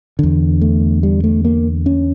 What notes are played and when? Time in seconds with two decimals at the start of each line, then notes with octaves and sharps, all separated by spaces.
0.19 E2 D3
0.61 A3
1.03 G3
1.24 A3
1.45 A#3
1.86 C#4